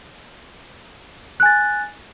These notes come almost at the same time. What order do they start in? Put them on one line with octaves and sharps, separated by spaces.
F#6 G#5 A6